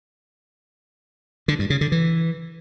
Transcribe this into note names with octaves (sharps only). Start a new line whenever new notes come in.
D3
G2
C#3
D3
E3